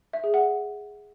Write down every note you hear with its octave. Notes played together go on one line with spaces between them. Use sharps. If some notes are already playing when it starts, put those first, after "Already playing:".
E5
G#4
F#5